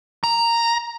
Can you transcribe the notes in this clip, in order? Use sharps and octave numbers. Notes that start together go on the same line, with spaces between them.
A#5